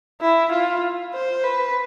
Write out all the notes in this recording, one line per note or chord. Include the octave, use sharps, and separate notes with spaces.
E4
F4
C5
B4